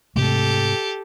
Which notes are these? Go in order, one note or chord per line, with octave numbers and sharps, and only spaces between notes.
G#2 C3 A3 G4 A4